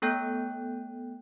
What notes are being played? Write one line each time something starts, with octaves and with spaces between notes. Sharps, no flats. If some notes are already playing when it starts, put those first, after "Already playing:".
A3 B3 A4 G5 F#6 G6